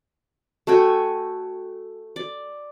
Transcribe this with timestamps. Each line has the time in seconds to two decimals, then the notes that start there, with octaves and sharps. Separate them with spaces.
0.67 A3 F#4 G5 G#5
2.16 D5